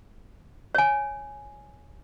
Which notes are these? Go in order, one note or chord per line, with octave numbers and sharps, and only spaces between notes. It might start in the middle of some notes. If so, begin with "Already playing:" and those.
C#5 G#5